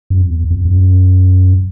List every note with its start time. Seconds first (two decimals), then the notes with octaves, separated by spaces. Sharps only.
0.10 F#2
0.21 F2
0.30 E2
0.50 F2
0.65 F2
0.70 F#2